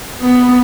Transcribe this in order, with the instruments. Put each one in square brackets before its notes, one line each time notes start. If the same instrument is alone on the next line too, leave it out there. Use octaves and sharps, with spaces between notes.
[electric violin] B3